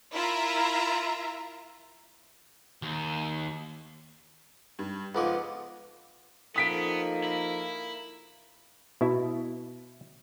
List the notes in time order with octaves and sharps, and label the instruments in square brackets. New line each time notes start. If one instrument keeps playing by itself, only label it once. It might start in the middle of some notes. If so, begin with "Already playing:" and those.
[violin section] E4 F4 A#4 E5 A#5
[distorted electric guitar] D#2
[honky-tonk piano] G2
[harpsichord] C#2 F3 G#3 [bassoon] B3 [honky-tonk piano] A4 D6
[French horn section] F3 D#4 A4 [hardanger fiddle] A#3 [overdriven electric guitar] B3 [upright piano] D#6 B6 D7
[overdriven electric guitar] E4
[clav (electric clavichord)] B2 E4